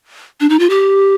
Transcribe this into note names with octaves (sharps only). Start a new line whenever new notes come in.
D4
D#4
F4
G4